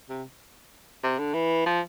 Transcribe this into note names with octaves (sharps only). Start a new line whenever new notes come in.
C3
C3
D3
E3
F3